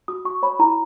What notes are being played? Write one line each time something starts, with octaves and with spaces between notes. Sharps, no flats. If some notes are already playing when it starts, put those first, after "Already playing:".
F#4 D#6
F#4 C#6
C#5 B5
E4 A#5